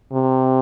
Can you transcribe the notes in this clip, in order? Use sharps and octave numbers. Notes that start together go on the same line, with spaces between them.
C3